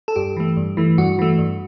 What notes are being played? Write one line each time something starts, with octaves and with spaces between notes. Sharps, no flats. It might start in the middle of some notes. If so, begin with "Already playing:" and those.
A4
G2 G4
E3 A3
G2
E3 A3
G2 F#4
E3 A3
G2